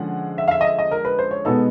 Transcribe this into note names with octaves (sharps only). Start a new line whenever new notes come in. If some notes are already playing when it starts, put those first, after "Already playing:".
Already playing: D3 F3 G#3 C#4 F#5
E5
F5
E5
D#5
E5
D#5
A#4
B4
C5
C#5
B2 G#3 B3 D#4 A4